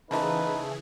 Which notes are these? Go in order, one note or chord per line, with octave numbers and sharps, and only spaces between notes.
C#3 E3 F3 A3 A#3 D#4 G#4 B4